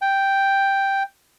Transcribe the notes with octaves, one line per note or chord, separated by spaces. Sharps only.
G5